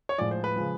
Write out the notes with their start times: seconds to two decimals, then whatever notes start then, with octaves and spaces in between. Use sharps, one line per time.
0.09 C#5
0.18 A2 F3 G#3 D5
0.31 C5
0.44 B4
0.56 C#3 F3 G#3